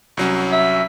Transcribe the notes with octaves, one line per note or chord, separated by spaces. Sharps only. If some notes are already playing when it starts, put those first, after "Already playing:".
C2 F#3 C#4
E5